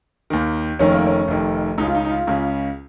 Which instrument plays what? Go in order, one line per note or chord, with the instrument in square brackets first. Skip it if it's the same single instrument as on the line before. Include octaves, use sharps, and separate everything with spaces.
[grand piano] D#2 D#3
F1 F2 D#3 C#4
A#3
C#4
F1 F2 D#3
C#2 D#4
C#3
F4
D#4
D#4
F4
C#2 C#3